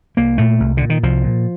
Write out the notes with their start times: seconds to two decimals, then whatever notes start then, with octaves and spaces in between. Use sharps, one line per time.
0.17 C2 A#3
0.38 A#2 A3
0.60 C2
0.77 A#2 D3
0.90 D#3
1.03 C2 F3
1.24 A#2